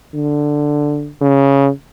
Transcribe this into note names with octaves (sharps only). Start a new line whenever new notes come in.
D3
C#3